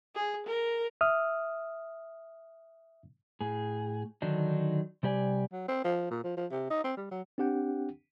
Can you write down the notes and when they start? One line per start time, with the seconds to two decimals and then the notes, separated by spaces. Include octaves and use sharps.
0.15 G#4
0.47 A#4
1.01 E5 D#6 F6
3.41 A2 G#4
4.22 D3 D#3 F#3 D4 D#4
5.03 C3 G3 G4 D5 G#5
5.52 F#3
5.68 C4
5.84 F3
6.11 A#2
6.24 F3
6.37 F3
6.51 C3
6.70 D#4
6.84 C4
6.97 G3
7.11 F#3
7.38 C4 D4 G4 F#5 G5